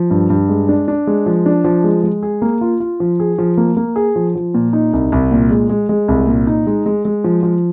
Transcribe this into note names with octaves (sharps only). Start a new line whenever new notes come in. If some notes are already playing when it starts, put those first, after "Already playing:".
Already playing: F3
G2
G2
G#3
D4
D4
G#3
F3
D4
F3
G#3
G#3
G#4
A#3
F4
F4
F3
G#4
F3
A#3
A#3
G#4
F3
F3
A#2
D#4
C2
C2
A#2
G#3
G#3
G#3
C2
A#2
D#4
G#3
G#3
G#3
F3
F3